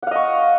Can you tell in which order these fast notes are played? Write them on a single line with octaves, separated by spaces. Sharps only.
F#5 F5 D#5 C#6